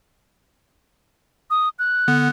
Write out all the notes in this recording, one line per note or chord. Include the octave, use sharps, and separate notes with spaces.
D#6
F#6
D3 B3